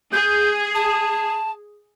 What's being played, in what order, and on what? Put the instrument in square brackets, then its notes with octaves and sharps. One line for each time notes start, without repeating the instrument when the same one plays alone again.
[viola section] G#4 [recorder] G6
[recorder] A5